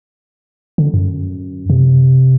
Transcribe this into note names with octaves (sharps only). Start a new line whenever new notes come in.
D3
F#2
C3